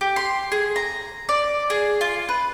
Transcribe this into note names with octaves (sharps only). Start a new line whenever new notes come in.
G4
C6
G#4
A#5
D5
G#4
F4
B4